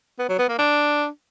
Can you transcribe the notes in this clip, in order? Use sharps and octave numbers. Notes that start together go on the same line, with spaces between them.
B3
F#3
B3
A#3
D4